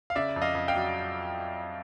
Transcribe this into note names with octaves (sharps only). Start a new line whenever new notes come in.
F5
C#3 D5 E5
F2
D#5 F5
F2
F5 G5
F#3